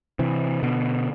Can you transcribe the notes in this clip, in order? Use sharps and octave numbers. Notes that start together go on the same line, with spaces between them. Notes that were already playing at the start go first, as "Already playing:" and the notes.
C3 E3
B2 D3